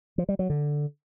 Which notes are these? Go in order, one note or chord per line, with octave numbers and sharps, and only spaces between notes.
F3
G3
F#3
D3